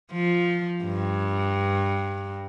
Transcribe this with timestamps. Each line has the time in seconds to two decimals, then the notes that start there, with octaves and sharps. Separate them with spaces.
0.12 F3
0.84 G2